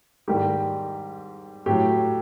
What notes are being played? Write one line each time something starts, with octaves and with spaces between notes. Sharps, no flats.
G#2 D#3 G3 G4
A2 F#3 G4